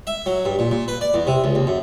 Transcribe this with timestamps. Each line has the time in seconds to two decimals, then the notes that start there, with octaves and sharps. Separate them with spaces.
0.07 E5
0.26 F#3
0.45 G2
0.59 A#2
0.71 A#2
0.88 B4
1.01 D5
1.14 E2
1.27 C3
1.44 C#2
1.55 D#2
1.67 F#2